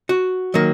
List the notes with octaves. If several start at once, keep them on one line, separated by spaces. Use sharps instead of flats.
F#4
D#3 F#3 A#3